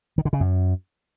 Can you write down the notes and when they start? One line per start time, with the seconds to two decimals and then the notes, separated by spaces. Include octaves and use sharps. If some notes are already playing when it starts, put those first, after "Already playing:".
0.18 D#3
0.25 D3
0.33 C#3
0.40 F#2